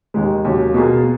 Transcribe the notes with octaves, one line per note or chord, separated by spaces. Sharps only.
D#2 D#3 G#3
D#2 C#3 F#3
B2 A#3 F4 G#4